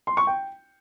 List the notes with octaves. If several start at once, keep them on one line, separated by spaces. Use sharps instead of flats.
C6
C#6
G5